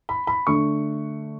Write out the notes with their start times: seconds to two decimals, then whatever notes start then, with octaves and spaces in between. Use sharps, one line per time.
0.09 B5
0.27 B5
0.47 D3 A3 D4 C#6